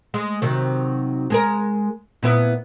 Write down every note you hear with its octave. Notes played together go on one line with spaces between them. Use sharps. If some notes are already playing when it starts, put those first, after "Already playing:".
G#3
C3 D#3 F#3
G#3 G#4 A#4
A#2 B3 E4